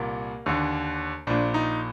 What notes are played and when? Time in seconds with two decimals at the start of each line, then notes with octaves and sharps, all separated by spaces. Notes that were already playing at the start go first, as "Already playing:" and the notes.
Already playing: C2 A#2 A#3
0.46 D#2 D3
1.27 A#1 A#2 D4
1.54 D#4